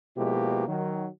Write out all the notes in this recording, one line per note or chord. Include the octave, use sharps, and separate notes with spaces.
B2 F3 G#3 A#3 E4 G4
D#3 F#3